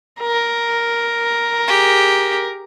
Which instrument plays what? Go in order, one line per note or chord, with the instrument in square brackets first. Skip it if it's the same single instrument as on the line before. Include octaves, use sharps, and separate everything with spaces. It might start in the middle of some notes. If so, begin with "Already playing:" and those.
[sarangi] A#4
[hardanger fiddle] G4 G#4